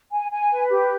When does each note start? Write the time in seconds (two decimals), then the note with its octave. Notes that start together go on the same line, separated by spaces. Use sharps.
0.12 G#5
0.31 G#5
0.50 B4
0.70 G4